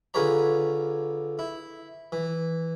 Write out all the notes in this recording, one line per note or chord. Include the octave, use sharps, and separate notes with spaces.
D3 F4 G#4 B4 C#5 A#5
E4
E3